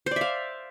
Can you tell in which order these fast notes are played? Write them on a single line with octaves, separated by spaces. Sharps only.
C5 D5 E5 F5